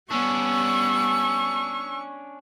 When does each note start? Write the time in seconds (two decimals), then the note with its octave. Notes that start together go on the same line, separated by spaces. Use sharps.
0.11 G3 B3 C#4 D4 C#6 E6